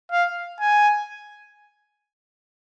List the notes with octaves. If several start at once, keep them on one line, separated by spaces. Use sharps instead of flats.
F5
G#5